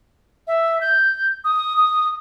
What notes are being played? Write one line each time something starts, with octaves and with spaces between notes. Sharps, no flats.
E5
G6
D#6
D#6